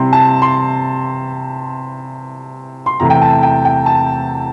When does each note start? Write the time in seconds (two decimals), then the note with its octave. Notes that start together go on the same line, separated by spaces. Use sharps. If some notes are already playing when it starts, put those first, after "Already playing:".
Already playing: C3 G3 C4 E4 C6
0.13 A5
0.42 C6
2.86 C6
3.00 E2 C3 E3 A3 E4 A#5
3.10 G5
3.22 A5
3.43 G5
3.65 G5
3.86 A5